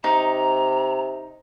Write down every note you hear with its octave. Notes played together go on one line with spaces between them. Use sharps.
C3 D#4 A#5